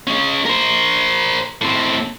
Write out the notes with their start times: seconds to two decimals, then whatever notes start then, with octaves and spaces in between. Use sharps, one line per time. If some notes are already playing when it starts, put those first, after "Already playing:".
0.07 G#3 C#4
0.45 A#4 C5
1.61 A2 C4